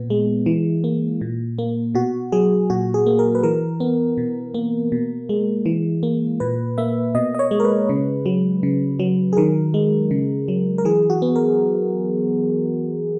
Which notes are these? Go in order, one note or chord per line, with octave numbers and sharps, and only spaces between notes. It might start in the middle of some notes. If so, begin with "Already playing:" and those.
Already playing: A#2 B3
G#3
E3
A#3
A#2
A#3
B2 F#4
F#3 G#4
A#2 F#4
G#4
A#3
A#4
B4
E3 A#4
B3
B2
A#3
B2
G#3
E3
A#3
A#2 B4
A#3 E5
B2 D#5
D#5
C#5
G#3
A#4
B4
C#3
F#3
C#3
F#3
G#4
D#3 A#4
G#3
C#3
F#3
A#4
E3 G#4
F#4
B3
A#4